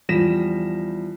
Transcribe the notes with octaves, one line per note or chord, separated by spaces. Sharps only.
E2 F3 G3 A#6 B6 E7